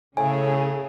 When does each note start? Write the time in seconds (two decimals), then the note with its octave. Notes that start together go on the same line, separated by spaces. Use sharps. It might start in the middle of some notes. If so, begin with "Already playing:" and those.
0.17 A2 C#3 C#4 G#4 A4 G#5